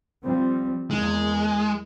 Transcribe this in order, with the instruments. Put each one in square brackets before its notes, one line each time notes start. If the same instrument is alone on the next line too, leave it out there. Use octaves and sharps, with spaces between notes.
[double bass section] F3 G3 C4
[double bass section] E2 A#3 [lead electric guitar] G#3